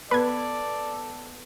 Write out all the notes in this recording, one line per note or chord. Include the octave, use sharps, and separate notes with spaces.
B3 A4 B4 D5 G#6